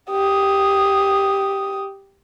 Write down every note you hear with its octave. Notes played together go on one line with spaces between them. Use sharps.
G4 D#6